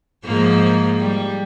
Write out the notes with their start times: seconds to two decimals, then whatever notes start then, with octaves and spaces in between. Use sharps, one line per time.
0.24 G#2 F3 A#3
0.99 G3